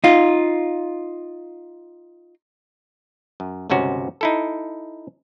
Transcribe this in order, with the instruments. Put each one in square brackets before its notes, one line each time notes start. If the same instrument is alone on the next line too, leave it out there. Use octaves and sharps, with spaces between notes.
[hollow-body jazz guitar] D#4 F4
[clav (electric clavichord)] F#2
G1 C#2 C3 C#4 F#4
D#4 E4 A4